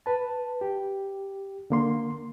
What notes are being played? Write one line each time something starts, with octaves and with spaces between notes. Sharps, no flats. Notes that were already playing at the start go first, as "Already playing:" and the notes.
B4 A5
G4
D3 A#3 C6